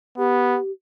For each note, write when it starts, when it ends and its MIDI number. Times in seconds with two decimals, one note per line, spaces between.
0.18 0.59 59
0.18 0.71 67